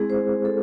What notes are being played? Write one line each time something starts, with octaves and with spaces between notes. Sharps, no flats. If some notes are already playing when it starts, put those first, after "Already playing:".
Already playing: G#3 C4 E4 G#4
C5
A4